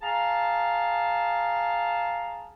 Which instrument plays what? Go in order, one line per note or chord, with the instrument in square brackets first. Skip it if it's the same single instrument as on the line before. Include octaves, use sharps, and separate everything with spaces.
[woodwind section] G#4 F5 A5 A#5